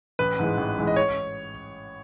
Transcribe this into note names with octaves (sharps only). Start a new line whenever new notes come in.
A1 B4
G#2 E3 G#3
A1
G#2 E3 G#3
D#5
C#5